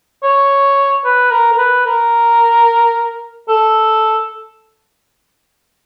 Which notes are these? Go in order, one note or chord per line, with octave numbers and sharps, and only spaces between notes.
C#5
B4
A#4
A#4
B4
A#4
A4